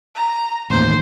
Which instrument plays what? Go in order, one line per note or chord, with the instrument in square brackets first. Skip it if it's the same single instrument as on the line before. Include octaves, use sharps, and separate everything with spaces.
[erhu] A#5
[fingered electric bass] A1 D#2 [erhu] C5